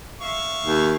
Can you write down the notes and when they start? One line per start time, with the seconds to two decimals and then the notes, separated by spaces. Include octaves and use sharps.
0.21 E5 F5 C#6
0.64 D#2